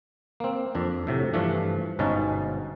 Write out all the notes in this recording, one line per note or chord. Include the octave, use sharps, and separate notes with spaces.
A#3 C4
F2 D4
A2 C3 F#3
G2 E3 F3 A3 D4
G1 G#2 B2 C#4 D#4 A5